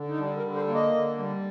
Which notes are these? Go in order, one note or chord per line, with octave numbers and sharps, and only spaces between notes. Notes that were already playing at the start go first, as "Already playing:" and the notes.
Already playing: D3
D#4
G3 D4
A#4
D3
C5
A#3
D#5
D3
G3